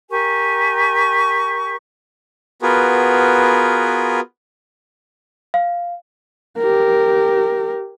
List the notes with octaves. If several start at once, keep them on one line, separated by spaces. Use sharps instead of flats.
G4 A#4 G#5 C#6
B3 F4 F#4 G#4 A#4 B4
F5
G4 A#4